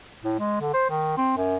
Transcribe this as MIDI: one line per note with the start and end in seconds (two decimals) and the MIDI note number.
0.24 0.35 45
0.39 0.60 56
0.61 0.73 50
0.74 0.86 72
0.90 1.13 51
1.17 1.36 60
1.37 1.57 42